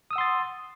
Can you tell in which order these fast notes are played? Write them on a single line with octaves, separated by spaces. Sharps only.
D#6 E6 F#5 C6 A6